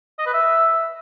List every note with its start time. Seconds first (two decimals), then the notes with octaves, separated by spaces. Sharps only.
0.19 D#5
0.26 B4
0.34 E5